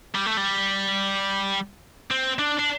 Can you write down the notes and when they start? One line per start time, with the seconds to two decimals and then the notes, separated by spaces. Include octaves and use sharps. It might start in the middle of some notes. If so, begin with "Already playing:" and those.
0.15 G3
0.26 A3
0.37 G3
2.11 C4
2.39 D4
2.59 D4